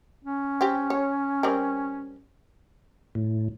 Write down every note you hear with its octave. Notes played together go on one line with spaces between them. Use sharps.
C#4
C4 G4
C#5
G3 C4 A#4
A2